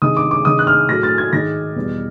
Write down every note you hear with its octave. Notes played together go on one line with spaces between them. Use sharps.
C3 D#3 G#3 D#6
D6
D6
C3 D#3 G#3 D#6
F#6
F6
A2 F#3 A3 A#6
A6
G#6
G#2 D#3 G#3 A#6
E2 B2 G3